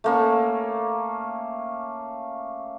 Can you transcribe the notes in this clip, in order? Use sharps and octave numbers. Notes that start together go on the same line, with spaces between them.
A3 A#3 C#4